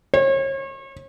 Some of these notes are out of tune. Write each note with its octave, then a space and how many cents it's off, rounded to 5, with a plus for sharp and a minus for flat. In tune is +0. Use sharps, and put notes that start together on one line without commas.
C#5 -40